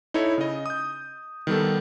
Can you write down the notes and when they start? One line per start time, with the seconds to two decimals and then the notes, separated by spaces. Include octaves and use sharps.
0.14 D#4 E4 A4 C#5
0.38 C#3 D#5
0.66 D#6 G6
1.47 D#3 G3 B3 A4